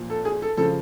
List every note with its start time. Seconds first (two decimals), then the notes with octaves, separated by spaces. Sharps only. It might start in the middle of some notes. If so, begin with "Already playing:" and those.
Already playing: A#2 F3
0.10 A4
0.25 G#4
0.42 A4
0.57 C#3 F3 A4